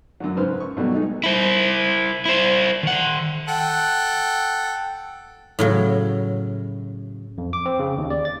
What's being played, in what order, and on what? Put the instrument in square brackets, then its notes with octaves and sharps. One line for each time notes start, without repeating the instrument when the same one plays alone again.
[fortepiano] F#2 D3 F#3
G#2 C#3 B4 C5 F6
C#6
B2 F#3 G3 A3 B3
G#3 A3 D#4
[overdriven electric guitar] E4 C5
E4 C5
D#3 F#5
[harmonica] A4 F#5 G5
[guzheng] A2 C#3 F#3
[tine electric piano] F2
D6
C4
C#3
D#2
D5
A6